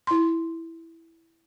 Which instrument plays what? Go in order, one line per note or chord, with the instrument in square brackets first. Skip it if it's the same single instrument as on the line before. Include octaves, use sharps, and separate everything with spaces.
[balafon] E4 C6